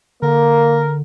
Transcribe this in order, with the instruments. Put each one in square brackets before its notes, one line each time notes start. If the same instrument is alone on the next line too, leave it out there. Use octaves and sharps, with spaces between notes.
[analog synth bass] D3 [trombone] A#3 [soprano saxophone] A#4